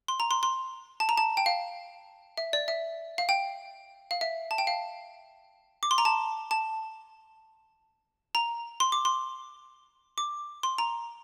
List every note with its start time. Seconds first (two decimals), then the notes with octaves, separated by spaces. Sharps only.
0.08 C6
0.20 A#5
0.31 C6
0.43 C6
1.00 A5
1.09 A#5
1.17 A5
1.37 G5
1.46 F5
2.38 E5
2.53 D5
2.68 E5
3.18 F5
3.29 G5
4.11 F5
4.21 E5
4.51 A5
4.58 G5
4.67 F5
5.83 D6
5.91 C6
5.98 A#5
6.05 A5
6.51 A5
8.35 A#5
8.80 C6
8.92 D6
9.05 C6
10.18 D6
10.63 C6
10.78 A#5